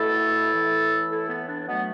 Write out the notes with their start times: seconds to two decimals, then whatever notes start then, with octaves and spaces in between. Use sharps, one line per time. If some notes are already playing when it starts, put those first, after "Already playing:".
Already playing: B2 A3 E4 A4
0.51 A2 E3 A3
1.09 E4 A4
1.28 B3
1.47 D4
1.67 B2 F#3 A3 B3